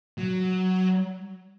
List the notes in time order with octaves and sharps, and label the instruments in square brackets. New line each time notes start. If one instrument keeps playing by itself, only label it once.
[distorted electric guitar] F#3